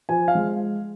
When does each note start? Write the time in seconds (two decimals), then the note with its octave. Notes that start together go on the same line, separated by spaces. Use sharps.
0.09 F3 G#5
0.28 F5
0.35 G#3